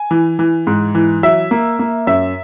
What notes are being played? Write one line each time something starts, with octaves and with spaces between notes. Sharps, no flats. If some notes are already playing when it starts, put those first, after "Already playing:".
Already playing: G#5
E3
E3
G#2
E3
F#3 E5
A#3
A#3
F#2 E5